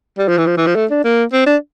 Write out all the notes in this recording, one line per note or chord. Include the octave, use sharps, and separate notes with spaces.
G3
F3
E3
F3
E3
F3
A3
D4
A#3
C4
D4